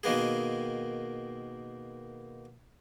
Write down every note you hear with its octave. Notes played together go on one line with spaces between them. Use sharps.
B2 D#3 A#3 B3 G#4